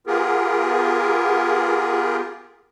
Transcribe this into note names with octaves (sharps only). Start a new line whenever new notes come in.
B3 F4 G4 G#4 A#4